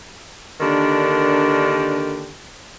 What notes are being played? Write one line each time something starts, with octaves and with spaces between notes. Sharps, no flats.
D3 D#3 A#3 D4 G4